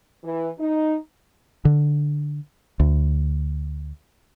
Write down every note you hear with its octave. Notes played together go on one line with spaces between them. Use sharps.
E3
D#4
D3
D2